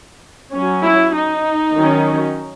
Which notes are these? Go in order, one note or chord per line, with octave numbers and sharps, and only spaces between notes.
F#3 C#4
E4
D#4
D#3 F#3 C#4